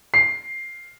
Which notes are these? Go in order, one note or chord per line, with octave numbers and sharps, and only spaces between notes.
C7